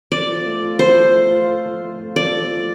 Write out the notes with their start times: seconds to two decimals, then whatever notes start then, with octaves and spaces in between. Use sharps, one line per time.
0.12 A4 D5
0.29 F3
0.46 A3
0.62 F4
0.79 A4 C5
0.96 F3
1.14 A3
1.30 F4
1.48 A4
1.66 F3
1.82 A3
1.99 F4
2.16 A4 D5
2.33 F3
2.50 A3